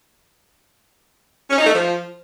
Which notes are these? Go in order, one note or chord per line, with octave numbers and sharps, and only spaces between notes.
C#4
D#4
A3
F3